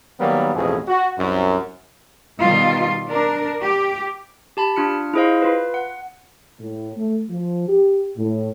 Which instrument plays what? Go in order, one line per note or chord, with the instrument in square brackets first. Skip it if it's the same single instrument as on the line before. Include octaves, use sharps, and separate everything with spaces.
[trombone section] D#3 F#3 G3 A#3 B3
A1 F2 B2 G#4
F#4
C2 F#2
[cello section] B2 D#3 G3 F4
D4 A#4
G4
[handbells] G4 A5 B5
D4 F4 F6 C#7
E4 F4 G#4 C5 D#5 F5
F4 B4
F#5
[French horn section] A2
A3
F3
G4
A2